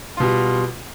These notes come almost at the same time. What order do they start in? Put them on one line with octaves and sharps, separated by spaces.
F4 B2 G3